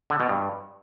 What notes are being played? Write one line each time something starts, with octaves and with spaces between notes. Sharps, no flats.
D3
B2
G2